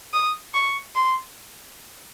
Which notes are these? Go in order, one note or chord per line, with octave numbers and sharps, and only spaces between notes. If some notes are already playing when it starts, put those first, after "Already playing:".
D#6
C#6
C6